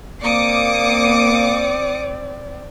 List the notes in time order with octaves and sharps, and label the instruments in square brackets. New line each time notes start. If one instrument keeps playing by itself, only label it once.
[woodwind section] A#3 [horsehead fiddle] C4 D5 [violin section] D6 D#6 C#7